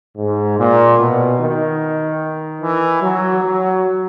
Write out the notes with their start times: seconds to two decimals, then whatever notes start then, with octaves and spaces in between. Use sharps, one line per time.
0.17 G#2
0.58 A#2
0.99 B2
1.39 D#3
2.61 E3
3.02 F#3
3.43 F#3